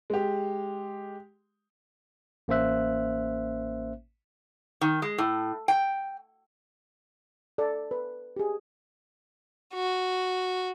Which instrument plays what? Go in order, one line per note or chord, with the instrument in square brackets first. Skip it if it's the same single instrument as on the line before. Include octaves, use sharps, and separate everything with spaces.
[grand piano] G#3 G4
[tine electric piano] A1 A#3 C#4 C5 E5 F#6
[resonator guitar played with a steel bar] D#3
G#3
A2
G5
[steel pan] A4 D5
B4
G4 G#4
[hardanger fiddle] F#4